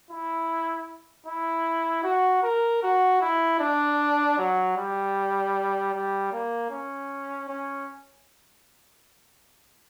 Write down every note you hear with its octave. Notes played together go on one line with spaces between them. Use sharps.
E4
E4
F#4
A#4
F#4
E4
D4
F#3
G3
G3
A#3
C#4
C#4